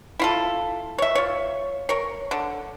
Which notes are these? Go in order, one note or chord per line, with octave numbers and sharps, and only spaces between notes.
E4 F4 A4
C#5 E5
F4 C#5
A#4 C#5
D3